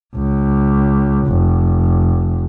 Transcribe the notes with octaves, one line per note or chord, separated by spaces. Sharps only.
C#2
F1